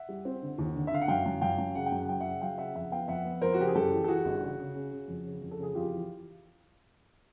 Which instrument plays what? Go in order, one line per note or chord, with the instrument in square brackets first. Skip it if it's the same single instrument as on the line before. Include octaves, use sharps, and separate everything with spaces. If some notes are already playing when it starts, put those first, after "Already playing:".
Already playing: [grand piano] E5 F#5
G3
C4
D3
D#2
D3
E5
D3 F5
F#5
F#2 F5 G5
F#2
F#2 F5 G5
F#2
C#3 F#5
G5
F#2
F#5
F#3 G5
C#3 E5 F#5
F#3 F5 G5
C#3 E5 F#5
F2 E5 F#5
B3 F5 G5
F2 E5 F#5
B3
F2 A#4 C5
F#4
C#3 G4
G#4
F#2 G4 A4
E3
A4
E3 F#4 G#4
G1
C#3
C#3
C#3
C#3
F2
C#3
F2
A4
C#3 G#4
F2 F4 G4
E3